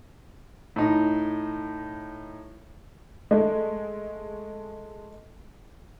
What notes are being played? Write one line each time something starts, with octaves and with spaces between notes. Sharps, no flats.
A2 D#4
G#3 A3